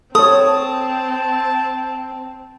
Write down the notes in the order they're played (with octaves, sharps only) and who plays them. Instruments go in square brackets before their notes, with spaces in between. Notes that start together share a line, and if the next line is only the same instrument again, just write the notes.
[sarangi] C4 [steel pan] A4 C#5 [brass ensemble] A5 [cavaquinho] D#6